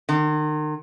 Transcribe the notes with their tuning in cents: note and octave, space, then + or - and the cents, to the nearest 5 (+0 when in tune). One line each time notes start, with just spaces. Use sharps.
D#3 -40